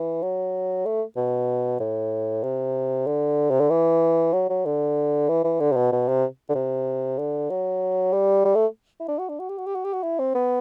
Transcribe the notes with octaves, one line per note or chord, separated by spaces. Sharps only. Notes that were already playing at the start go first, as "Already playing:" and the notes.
Already playing: E3
F#3
A3
B2
A2
C3
D3
C3
D3
E3
F#3
F#3
D3
E3
E3
D3
C3
B2
B2
C3
D3
C3
D3
F#3
G3
G3
A3
E4
D4
F#4
D4
F#4
G4
F#4
G4
F#4
G4
F#4
E4
C4
B3